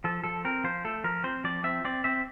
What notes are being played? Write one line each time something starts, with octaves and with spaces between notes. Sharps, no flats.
F3 A4
F3 A4
C4 A#4
F3 C5
A3 A4
F3 A#4
C4 C5
F3 D5
C4 E5
C4 D5
C4 E5